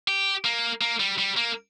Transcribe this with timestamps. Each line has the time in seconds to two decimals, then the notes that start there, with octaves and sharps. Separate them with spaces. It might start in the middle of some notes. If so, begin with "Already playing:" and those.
0.08 G4
0.45 A#3
0.81 A#3
1.00 G3
1.19 G3
1.37 A#3